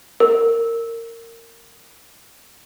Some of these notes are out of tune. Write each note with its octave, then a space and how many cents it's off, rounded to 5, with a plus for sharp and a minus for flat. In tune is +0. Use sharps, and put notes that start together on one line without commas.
A#4 -20